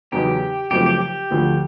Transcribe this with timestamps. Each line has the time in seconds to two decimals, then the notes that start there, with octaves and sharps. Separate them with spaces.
0.12 E2 C#3 F#3 B3 D#4 G4
0.71 F#2 C#3 F3 A3 C4 G4
0.86 G4
1.01 G4
1.30 D2 D3 F3 A3